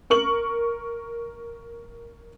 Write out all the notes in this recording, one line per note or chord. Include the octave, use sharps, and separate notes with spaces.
A#4 C#6 F#7